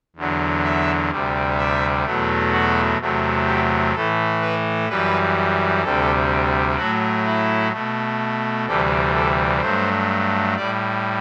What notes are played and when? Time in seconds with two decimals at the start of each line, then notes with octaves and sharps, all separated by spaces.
0.16 E2 D3 F#3
0.64 E5
1.10 D2 C3 G3
1.58 E5
2.05 E2 B2 F#3 A3
2.52 F#4
2.99 E2 C3 F#3 A3
3.46 G4
3.93 A2 E3 A3 A4
4.41 B4
4.89 F#2 E3 G3 B4
5.83 D2 C3 G3 A4
6.77 A2 F#3 A3 F#4
7.26 E4
7.73 B2 A3
8.66 D2 C3 E3 G3 A4
9.14 A4
9.61 G2 F#3 A3 C5
10.56 A2 G3 D5